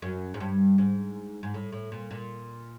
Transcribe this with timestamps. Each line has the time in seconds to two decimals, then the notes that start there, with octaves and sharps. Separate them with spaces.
0.02 F#2
0.34 G#2
0.40 G2
0.78 G#2
1.43 G#2
1.54 A2
1.72 A2
1.92 A#2
2.11 A#2